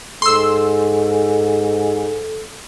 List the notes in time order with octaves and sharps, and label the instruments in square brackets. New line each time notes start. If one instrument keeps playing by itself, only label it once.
[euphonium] G#2 [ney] A4 [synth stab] C6 E6